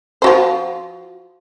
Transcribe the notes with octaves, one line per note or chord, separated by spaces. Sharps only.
F3 F#4 C5